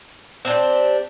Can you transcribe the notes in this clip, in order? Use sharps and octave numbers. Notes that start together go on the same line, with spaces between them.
C4 D4 G4